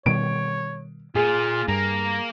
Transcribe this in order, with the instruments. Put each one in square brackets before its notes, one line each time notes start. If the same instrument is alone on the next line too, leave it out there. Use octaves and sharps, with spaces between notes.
[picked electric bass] B2 D#3 G3 [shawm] C#5 [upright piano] D7
[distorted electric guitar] A#2 [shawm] F4 [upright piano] G#4
[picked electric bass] G2 [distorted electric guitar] A#3 [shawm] A#5